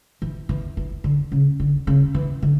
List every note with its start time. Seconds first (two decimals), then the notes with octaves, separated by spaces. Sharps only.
0.22 E3
0.49 E3
0.77 E3
1.04 D3
1.32 C#3
1.60 D3
1.87 C#3
2.15 E3
2.42 D3